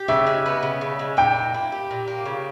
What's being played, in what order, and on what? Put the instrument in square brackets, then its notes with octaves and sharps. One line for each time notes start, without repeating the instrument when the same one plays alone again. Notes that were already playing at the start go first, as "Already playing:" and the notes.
Already playing: [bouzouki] G4
[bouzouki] C#3 [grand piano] E5
[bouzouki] G#3
B3
C#3
C#3
G#3
[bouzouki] A#2 [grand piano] G5
[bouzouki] A#3
E4
G4
A#2
A#3
C#3